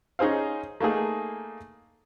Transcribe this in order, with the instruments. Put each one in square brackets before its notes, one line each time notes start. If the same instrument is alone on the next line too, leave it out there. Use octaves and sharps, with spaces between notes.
[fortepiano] C#4 D#4 G#4 C5 F5
A3 A#3 D#4 G#4